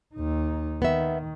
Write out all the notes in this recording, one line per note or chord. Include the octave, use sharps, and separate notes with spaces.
D#2 D#4
D#3 B3 E5